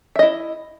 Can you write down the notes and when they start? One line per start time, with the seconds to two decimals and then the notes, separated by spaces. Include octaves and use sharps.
0.16 E5
0.19 D#5
0.23 E4